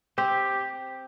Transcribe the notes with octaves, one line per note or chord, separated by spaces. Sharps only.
C4 G4